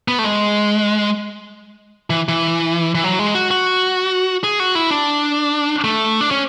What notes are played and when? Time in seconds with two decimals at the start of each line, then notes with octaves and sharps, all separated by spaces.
0.08 B3
0.19 A3
0.24 G#3
2.10 E3
2.29 E3
2.95 E3
3.04 F#3
3.19 G#3
3.35 F#4
3.51 F#4
4.44 G#4
4.60 F#4
4.75 E4
4.91 D4
5.84 A3
6.21 D4
6.31 C#4